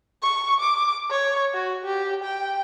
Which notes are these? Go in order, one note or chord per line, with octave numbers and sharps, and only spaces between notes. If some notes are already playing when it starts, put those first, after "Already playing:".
C#6
D6
C#5
F#4
G4
G5